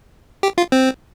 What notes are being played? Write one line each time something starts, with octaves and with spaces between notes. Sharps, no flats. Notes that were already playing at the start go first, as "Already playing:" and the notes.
G4
F4
C4